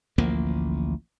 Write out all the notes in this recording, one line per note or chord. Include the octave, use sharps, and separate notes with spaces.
A1 D2 F3 A#3